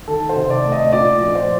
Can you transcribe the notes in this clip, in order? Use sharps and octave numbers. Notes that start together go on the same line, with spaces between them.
D#3 A4
C5
C3
D5
A3
D#5
A#2 D5
F3
C5